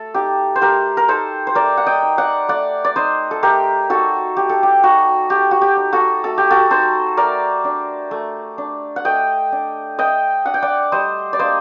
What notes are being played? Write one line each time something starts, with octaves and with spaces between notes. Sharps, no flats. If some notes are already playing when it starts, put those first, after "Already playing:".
Already playing: A3 A4
D#4 G4
C5
A3 G4 A#4
A#4
D#4 A4 C5
C5
A3 A#4 D5
F#5
D#5 G5
D#4
D5 F#5
A3 D5 F#5
D5
D#4 C5 D#5
A4
A3 G4 A#4
D#4 F#4 A4
A3 G4
A4
G4
D#4 F#4
A3 G4
F#4
G4
D#4
F#4 A4
A3 A4
G4
F#4 A4
D#4 A4 C5
A3 A#4 D5
D4
A3
D4
F#5
A3 D#5 G5
D4
A3 D#5 G5
D4 F#5
G5
D5 F#5
G3 C5 D#5
D5
A#3 D4 C5 D#5